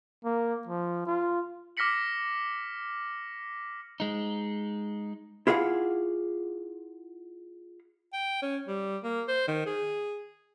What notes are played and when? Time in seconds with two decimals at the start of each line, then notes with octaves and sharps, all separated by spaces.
0.24 A#3
0.67 F3
1.07 F4
1.77 D6 F6 A#6 B6 C#7 F#7
4.00 G#3 D#4
5.47 E4 F4 G#4 D#5 F5 F#5
8.13 G5
8.42 C#4
8.68 G3
9.04 A#3
9.28 C5
9.48 D#3
9.66 G#4